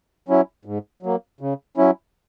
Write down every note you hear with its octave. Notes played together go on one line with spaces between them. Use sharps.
F#3 C#4 E4
G#2
F#3 A#3
C#3
F#3 C#4 E4